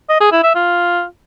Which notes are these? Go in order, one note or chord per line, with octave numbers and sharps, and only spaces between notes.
D#5
G#4
E4
E5
F4